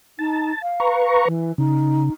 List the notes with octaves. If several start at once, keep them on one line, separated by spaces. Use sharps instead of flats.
D#4 A5
F5
B4 A#5 C#6
E3
C#3 D#4